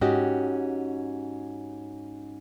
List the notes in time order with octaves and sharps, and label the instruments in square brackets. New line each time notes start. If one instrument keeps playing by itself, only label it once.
[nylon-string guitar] G#2 C#4 F#4 G4 D#5